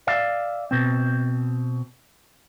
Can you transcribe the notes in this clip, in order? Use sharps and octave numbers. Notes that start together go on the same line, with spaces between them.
D5 E5 F5
B2 C4